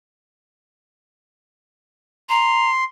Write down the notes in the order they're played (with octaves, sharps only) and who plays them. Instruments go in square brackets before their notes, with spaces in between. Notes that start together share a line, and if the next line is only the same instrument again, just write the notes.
[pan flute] A#5 [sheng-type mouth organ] C6